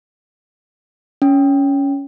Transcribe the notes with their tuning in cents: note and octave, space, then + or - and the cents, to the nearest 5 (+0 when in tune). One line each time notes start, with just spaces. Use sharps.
C#4 +10